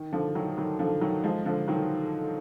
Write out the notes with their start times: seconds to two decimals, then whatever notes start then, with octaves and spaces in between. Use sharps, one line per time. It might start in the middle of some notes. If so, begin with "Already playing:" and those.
Already playing: D#3
0.13 D3 F3
0.35 D#3 F#3
0.57 D#3 F#3
0.79 D3 F3
1.01 D#3 F#3
1.24 F3 G#3
1.45 D3 F3
1.68 D#3 F#3